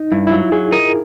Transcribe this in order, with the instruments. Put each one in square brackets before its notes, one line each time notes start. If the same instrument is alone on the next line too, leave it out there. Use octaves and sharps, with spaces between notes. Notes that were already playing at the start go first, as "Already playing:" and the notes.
Already playing: [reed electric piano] D#4
[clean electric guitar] G2 [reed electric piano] E4
[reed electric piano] E4
[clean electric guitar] F#3 [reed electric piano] F4
[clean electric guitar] F#3 [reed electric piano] G#4
[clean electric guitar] D#4 [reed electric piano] A#4